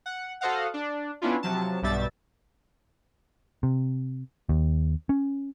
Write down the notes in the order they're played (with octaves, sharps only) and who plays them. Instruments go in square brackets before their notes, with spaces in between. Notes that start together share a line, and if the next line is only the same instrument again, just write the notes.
[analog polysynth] F#5
F#4 A4 C5 D#5 F5 F#5
D4
B3 C#4 D4 E4 F4
C3 F3 F#3 A5
B1 G2 B2 G3 E5 A6
[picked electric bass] C3
D#2
C#4